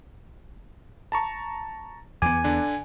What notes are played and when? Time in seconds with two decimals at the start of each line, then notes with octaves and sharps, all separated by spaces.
1.12 A5 A#5 C#6
2.22 E2 B3 G#5 D6
2.44 D3 D4